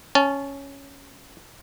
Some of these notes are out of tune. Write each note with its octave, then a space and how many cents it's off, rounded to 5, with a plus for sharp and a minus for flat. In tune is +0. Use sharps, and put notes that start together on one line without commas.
C#4 +0 A5 -20